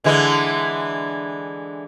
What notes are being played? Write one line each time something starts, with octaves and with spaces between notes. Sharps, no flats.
D3 E3 G#3